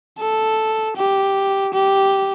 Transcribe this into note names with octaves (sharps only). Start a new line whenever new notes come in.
A4
G4
G4